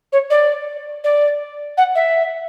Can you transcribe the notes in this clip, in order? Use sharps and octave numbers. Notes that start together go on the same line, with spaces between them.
C#5
D5
D5
F#5
E5